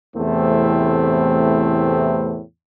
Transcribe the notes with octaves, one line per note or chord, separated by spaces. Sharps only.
E2 A2 C3 E3 A3 C4